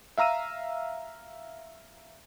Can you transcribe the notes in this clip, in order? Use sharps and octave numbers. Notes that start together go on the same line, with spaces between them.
E5 F5 A#5 E6 D#7